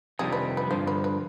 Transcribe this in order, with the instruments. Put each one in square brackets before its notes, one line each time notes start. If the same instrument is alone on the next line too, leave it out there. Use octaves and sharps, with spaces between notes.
[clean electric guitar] F2 C3 D#3 G3 D4 [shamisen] G#4
[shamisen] B4
B4
[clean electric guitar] G2 D3 F3 [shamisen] C5
[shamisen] B4
B4